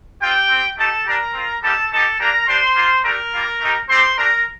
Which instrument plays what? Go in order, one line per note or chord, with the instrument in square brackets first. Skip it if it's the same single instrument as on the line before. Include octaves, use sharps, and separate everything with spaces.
[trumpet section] C4 F4 G4 G5
C4 G4
A3 D#4 G4 A4 A5
G3 D4 G4 A#4 A#5
C4 F4
G3 A#3 D#4 G4 A4 A5
A3 D#4 G4 A4 A5
A#3 D4 G4 A#4 A#5
G3 D4 G4 C5 C6
A#3 F4
A3 D4 G4 A#4 A#5
G3 A#3 F4
A3 D#4 G4
A3 C4 G4 C5 C6
A3 D4 G4 A#4 A#5